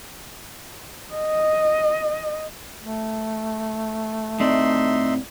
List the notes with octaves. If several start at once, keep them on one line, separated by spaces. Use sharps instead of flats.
D#5
A3
A2 C4 D#4 D5 E5 C6